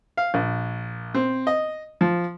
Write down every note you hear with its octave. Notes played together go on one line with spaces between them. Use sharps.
F5
A#1
C4
D#5
F3